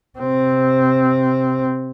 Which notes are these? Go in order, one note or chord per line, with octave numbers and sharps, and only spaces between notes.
C3 C4